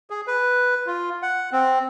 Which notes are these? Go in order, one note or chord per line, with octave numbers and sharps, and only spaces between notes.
G#4
B4
F4
F#5
C4